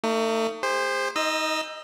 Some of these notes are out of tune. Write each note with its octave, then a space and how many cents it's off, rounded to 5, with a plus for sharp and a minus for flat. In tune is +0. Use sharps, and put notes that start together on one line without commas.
A3 +35 D#4 +0
G#4 -45 C5 +0
D#4 +25 D#5 -10 E6 +20